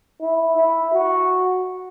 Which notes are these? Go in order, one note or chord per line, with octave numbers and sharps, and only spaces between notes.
E4
E4
F#4